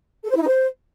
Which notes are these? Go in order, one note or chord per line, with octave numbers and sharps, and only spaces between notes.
A4
C5
E4
D#4
C5